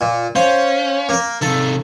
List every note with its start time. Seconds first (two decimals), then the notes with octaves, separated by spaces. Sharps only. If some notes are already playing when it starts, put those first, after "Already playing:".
0.01 A#2
0.36 C#4 C5 F5
1.09 A#3 A#4
1.42 C3 D#3 A4